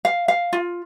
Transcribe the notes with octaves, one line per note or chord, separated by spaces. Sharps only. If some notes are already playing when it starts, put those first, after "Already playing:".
F5
F5
F4